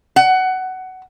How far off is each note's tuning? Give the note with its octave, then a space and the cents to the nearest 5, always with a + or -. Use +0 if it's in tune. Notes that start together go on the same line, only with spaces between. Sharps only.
F#5 +15